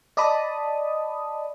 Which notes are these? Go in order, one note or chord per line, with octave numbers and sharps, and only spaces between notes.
D5 D#5 A5 B5 D#6